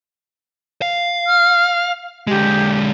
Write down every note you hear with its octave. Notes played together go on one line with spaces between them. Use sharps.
F5
F6
D3 G#3 G4